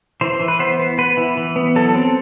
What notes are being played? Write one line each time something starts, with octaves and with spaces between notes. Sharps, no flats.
E3 C5
E3
B4
B3 C5
B3
B3 B4
E3
E3
B3
F#3 A4
C4